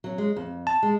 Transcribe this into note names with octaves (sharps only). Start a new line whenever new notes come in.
F#3 C#4
G#3
F2
A5
G#3